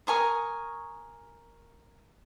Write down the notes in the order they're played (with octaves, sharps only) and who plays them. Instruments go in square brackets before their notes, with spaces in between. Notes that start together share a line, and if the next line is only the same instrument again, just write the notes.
[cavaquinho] A#4 G#5 C#6 D#6